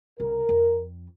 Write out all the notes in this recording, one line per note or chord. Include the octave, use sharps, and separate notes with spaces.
C2 C#3 A#4
F2